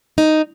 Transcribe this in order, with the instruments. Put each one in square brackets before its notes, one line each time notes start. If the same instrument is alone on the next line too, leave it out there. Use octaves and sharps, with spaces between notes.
[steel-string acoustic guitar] D#4